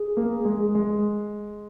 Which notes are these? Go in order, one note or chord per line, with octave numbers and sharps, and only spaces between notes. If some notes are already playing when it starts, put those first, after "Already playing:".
Already playing: G#4
A#3
G#3
G#3